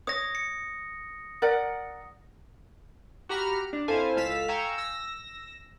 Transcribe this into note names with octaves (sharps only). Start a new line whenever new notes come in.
C#5 D#6 A#6
C#7
A#4 D5 F#5
F#4 G4 A#5 B5 F6
D4
F2 E4 A4 C5 F5 G#5
C#2 A4 F5 E6 B6
F5 G5 G#5 A#5 C#6 E6
E6 A#6